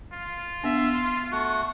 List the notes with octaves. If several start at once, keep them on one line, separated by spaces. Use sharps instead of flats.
F4
B3 D4 E5
C6
A3 F#4 C#6